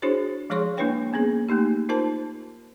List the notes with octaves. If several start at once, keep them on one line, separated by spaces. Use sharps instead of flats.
D4 E4 F#4 G#4 C5 C#5
F3 G#3 G#4 C#5 C6 C#6
A#3 D4 E4 B4 C#5 G5
A#3 B3 C#4 G#4
A3 A#3 D#4 G4
D#4 F4 A#4 C5 A5